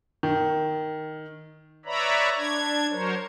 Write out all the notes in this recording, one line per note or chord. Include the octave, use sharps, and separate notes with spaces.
D#3
B4 C#5 D5 E5 A#5 B5
D4 G#6
F#3 A#4 C5 C#5